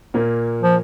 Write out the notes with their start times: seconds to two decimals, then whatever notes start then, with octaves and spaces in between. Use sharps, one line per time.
0.14 A#2 A#3
0.62 F3